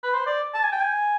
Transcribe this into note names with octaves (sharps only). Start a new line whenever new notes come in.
B4
C5
D5
A5
G#5
G5
G#5